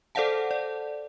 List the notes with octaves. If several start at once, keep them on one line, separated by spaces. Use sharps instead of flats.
A4 C5 D5 F5 F#5 A5
D5